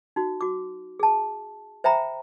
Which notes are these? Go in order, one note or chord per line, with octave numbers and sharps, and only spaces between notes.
D#4 F#4
F#4 D6
G#4 A5
C5 E5 G5 A#5 B5